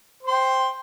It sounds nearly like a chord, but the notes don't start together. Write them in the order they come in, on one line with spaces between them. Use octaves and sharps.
C5 C6 G5